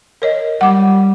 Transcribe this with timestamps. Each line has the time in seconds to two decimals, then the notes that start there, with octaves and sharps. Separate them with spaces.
0.22 A#4 C#5 D#5
0.61 G3 F#5 D6